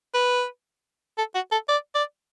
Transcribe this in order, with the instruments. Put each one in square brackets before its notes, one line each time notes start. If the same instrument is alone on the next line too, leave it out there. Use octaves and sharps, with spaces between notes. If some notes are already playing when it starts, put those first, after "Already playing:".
[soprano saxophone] B4
A4
F#4
A4
D5
D5